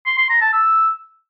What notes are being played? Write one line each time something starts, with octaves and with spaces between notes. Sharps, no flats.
C6
C6
A#5
A5
E6